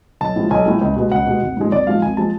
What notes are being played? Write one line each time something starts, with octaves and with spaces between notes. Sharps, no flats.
B1 A5
A2 F3 G#3
B1 G#5
A2 F3 G#3
C#2
B2 G#3
C#2 F#5
B2 G#3
G#1
G#2 F3 G#3
G#1 D5
G#2 F3 G#3 F5
G#1 G#5
F3 G#3 A5